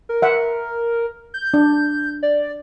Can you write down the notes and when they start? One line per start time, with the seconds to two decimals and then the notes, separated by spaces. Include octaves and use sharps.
0.09 A#4
0.22 E5 F#5
1.34 G6
1.54 D4
2.23 D5